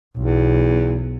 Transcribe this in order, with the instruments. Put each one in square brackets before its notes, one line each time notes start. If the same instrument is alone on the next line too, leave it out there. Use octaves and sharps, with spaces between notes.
[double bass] B1 [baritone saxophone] E2